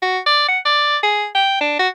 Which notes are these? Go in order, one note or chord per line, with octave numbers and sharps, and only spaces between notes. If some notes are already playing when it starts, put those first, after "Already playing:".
F#4
D5
F#5
D5
G#4
G5
D4
F#4